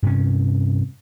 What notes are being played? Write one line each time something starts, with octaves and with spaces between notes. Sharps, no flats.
G2 C3 C#4